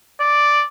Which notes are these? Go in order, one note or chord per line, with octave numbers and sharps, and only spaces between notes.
D5